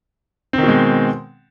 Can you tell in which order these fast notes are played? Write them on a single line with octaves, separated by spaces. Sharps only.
C4 D#3 B2 G#3